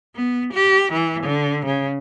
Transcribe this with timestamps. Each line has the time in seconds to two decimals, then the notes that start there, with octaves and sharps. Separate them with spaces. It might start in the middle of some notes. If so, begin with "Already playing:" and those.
0.16 B3
0.54 G4
0.93 E3
1.24 D3
1.66 C#3